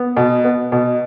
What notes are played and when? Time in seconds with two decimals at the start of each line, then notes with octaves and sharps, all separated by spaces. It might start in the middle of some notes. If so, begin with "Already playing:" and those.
Already playing: B3
0.17 B2
0.44 B3
0.72 B2